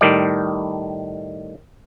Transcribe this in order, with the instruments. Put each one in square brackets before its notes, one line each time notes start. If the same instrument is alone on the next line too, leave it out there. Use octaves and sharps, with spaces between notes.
[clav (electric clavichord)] A2 D#3 G3 D5